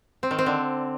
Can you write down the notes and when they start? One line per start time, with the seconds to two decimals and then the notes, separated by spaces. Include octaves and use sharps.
0.23 C4
0.31 D#3
0.39 C4
0.46 D3